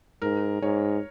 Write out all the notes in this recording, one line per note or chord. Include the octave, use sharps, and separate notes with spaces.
G#2 A#4
G#2 C#5